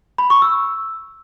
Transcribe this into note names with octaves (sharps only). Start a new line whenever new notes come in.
B5
C#6
E6